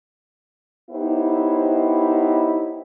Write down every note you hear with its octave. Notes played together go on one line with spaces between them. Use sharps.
B3 D#4 E4 G4 C5 C#5